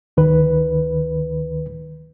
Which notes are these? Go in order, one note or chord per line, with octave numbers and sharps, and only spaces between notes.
D2 D#3 B4